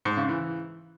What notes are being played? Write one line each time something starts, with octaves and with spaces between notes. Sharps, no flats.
G#2
C#3
E3